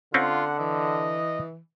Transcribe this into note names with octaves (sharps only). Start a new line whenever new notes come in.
D3 C4 C#4 F4 F#5
E3 D#5